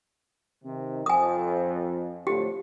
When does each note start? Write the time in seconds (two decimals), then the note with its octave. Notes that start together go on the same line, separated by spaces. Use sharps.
0.64 C3 D#3
1.06 F2 G#5 D#6
2.27 A2 D3 F3 G4